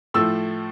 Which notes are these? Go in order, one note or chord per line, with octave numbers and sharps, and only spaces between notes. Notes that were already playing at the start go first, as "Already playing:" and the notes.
A2 F3 A3 E6